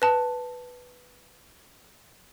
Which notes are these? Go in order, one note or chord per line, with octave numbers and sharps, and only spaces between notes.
B4 A5